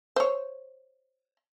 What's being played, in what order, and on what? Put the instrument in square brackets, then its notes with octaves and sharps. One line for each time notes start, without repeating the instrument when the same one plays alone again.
[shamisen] C5 C#5